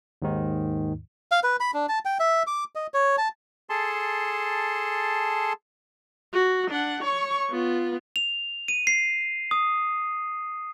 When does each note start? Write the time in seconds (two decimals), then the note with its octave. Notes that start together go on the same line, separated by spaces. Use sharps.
0.22 D#2 G#2 D#3
1.32 F5
1.43 B4
1.60 B5
1.74 D4
1.89 A5
2.05 G5
2.20 E5
2.47 D6
2.75 D#5
2.94 C#5
3.18 A5
3.70 G#4 A4 A5 C6
6.33 F#4
6.71 D4 F#5
7.03 C#5 C#6
7.50 B3 F4
8.16 F7
8.68 D#7
8.87 C7
9.51 D#6